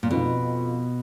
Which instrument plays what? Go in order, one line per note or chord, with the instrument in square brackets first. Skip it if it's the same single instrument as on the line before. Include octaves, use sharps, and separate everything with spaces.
[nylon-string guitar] A#2
[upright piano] F2 F3 B3 D#4 [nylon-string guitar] B2